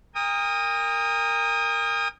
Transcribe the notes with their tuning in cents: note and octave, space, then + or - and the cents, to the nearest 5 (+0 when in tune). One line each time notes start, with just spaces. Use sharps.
A#4 -10 G5 +45 D#6 +0